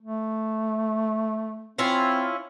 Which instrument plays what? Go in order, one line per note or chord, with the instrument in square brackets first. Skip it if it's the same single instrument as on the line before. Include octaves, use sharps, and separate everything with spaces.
[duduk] A3
[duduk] C4 [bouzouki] C#4 E4 F4